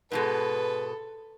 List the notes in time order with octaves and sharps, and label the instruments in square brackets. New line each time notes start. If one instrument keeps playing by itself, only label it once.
[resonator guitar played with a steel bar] G#2 B2 G#3 [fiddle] A4 [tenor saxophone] B4